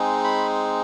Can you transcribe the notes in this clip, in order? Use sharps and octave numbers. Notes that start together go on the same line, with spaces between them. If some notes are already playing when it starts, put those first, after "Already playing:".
Already playing: G#3 C4 D#4 G#4
B5